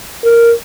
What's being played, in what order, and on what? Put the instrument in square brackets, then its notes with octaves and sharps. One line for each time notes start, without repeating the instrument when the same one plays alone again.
[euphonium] A#4